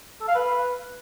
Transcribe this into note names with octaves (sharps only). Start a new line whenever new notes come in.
A4
F5
B4